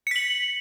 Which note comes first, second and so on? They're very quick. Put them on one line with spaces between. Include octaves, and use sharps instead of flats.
C#7 B6 F#7